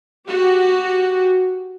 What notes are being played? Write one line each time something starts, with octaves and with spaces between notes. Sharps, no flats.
F#4 G4